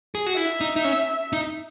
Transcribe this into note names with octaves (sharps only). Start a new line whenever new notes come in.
G#4
F#4
E4 E5
D#4
D#4
C#4
D#4